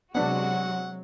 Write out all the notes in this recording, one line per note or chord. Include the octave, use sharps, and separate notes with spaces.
C3 F#3 G#3 B3 D4 F#4 F#5